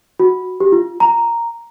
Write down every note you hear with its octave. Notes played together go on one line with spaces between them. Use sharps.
F#4
G4
F4
A#5